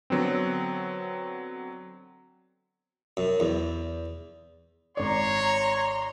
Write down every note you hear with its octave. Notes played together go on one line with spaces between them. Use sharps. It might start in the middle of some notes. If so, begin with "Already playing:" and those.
D3 F#3 B3 C4
F#2
E2
G#1 C#5 D5 A#5 C6